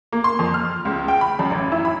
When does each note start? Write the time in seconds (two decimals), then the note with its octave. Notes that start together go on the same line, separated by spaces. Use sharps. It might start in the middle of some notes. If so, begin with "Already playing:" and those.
0.12 A#3
0.24 C6
0.39 F2
0.54 F6
0.85 C#2
1.08 G5
1.21 B5
1.39 F#2
1.51 A1
1.72 E4
1.85 B5